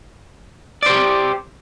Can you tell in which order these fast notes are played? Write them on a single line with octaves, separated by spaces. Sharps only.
D5 C5 G4